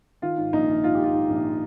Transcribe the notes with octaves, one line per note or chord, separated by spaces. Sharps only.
D#3 F4
G#2
A#1 D#4
A#1
G#2 F4
G4
G#2 F4
G#2
A#1